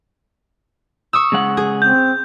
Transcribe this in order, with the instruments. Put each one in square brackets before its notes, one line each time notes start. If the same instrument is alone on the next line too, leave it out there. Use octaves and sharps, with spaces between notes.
[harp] C#6 D#6 E6
[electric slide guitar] C#3 G#3 F#5
[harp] G#4
[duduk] C4 [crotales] G6